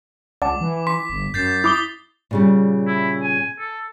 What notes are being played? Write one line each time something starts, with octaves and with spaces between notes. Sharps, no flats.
C#2 D5 F#5 A5 D6
E3
C6 B6
G1
F#2 G6 A6 C7
E4 D6 D#6 G7
A#2 C#3 G3
E4
G#5
A4